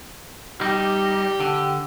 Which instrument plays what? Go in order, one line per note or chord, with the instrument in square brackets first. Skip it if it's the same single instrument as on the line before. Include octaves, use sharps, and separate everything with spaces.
[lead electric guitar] G3 D#4 [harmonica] G4
[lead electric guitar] D3